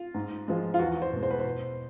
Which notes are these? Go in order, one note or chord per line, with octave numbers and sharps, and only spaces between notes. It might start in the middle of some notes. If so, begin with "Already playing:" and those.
Already playing: F4
G#2
F3 G#3
F4
E2 F#4
C5
B2 G#3
C5
B4
C5
B2